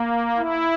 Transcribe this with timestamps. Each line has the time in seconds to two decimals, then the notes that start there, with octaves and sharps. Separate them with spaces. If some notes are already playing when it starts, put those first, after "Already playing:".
Already playing: A#3
0.37 E4